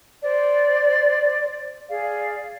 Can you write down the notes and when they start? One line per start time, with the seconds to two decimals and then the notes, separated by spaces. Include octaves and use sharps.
0.22 C5 D5
1.89 G#4 D5 F5